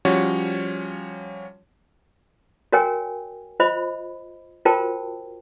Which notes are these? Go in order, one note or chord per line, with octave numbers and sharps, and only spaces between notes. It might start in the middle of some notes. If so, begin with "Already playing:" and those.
F3 G3 C#4 F#4 C#5
F#4 A#4 C#5 G5 G#5
F4 C5 D#5 B5
F4 F#4 A#4 C5 G5 A5